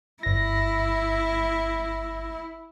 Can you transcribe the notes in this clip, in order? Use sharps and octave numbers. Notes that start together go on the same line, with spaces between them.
G1 E4 A#6